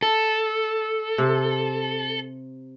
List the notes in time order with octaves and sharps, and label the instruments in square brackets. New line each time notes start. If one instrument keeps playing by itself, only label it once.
[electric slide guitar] A4
[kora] C3